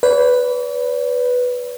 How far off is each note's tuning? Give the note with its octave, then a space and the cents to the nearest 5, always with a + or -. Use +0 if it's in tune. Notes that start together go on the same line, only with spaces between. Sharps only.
B4 +0 D5 -45